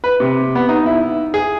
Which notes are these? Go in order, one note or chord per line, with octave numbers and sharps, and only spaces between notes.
B4
C3
B3
D#4
E4
G#4